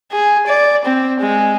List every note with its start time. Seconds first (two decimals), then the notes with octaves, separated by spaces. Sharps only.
0.11 G#4
0.47 D5
0.85 C4
1.20 G#3